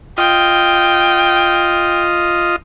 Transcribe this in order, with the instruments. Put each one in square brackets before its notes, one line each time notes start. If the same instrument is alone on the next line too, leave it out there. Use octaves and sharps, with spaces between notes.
[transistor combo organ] F4 D#5 [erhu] G5